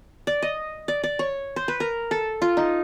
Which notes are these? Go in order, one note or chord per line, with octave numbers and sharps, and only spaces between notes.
D5
D#5
D5
D5
C#5
C5
B4
A#4
A4
F4
D#4